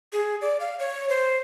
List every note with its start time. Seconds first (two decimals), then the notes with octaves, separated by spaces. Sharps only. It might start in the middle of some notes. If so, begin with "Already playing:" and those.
0.13 G#4
0.41 D5
0.60 F5
0.79 C#5
1.09 C5